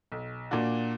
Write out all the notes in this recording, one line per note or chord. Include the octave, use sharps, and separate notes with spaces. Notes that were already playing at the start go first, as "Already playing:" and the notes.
B1
A#2 A#3 D4 F#4